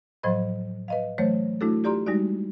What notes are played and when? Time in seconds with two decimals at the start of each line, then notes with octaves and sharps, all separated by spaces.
0.23 A2 F3 F#3 C5 D#5 B5
0.88 B4 D#5 F5
1.18 E3 F#3 A3 C5 C#5
1.61 A3 D4 E4 F#4 A4
1.84 F4 G4 D5 A#5 C6
2.06 G3 G#3 D#4 F#4 D5